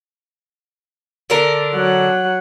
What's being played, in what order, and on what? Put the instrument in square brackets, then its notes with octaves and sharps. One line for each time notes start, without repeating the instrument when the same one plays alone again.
[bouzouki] D3 D4 A#4
[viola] F#3 F#5